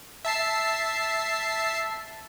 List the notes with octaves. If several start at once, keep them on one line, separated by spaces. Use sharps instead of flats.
E5 A5 C7